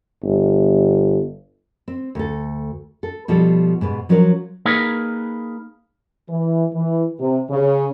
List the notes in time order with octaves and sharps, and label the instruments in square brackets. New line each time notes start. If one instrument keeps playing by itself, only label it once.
[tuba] G1
[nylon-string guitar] C4
D2 A4
A4
B2 F3 G3 A4
G#2 B2 B3
F3 F#3 C#4 A#4 C5 C#5
[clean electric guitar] A#3 D#4 G#4 A#4 B4
[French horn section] E3
E3
C3
C#3